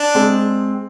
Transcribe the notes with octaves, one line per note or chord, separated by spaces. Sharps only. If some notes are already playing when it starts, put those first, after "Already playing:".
Already playing: D4
G#3 C4